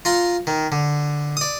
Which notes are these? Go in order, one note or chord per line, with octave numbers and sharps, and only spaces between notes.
F4 A#5 C6
D#3
D3
D5 D#6